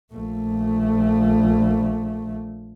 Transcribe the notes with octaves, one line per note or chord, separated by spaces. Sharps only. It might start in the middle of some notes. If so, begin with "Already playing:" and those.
A#1 A3